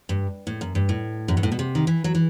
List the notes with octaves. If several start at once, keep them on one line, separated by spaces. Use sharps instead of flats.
G2
A2
F#2
G2
A2
F#2
G2
A2
B2
C3
D#3
E3
F#3
E3